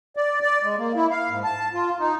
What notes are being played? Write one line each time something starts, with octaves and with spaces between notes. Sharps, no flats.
D5
D5
G#3
A#3
E4
F5
G#2
A5
F4
D#4